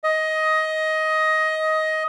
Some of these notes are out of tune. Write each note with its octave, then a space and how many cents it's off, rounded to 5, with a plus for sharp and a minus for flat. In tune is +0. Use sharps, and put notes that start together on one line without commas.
D#5 +15